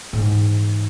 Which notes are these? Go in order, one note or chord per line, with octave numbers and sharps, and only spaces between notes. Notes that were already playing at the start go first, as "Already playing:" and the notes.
G#2 E3